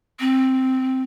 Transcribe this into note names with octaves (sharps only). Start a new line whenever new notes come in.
C4